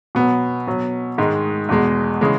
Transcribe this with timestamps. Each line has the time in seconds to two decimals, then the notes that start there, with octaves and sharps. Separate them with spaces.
0.15 B2 F#3 B3
0.67 B2 F#3
1.18 G#2 D#3 G#3
1.69 E2 B2 G#3
2.21 C#3 E3 G#3